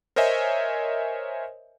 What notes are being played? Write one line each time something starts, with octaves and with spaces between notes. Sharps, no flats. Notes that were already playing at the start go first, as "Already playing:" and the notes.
A#4 C5 C#5 D#5 E5 G#5